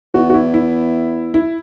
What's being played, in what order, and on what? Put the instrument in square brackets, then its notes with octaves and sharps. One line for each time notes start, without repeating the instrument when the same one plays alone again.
[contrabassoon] E2 [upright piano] F#4
[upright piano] F#4
E4
E4
E4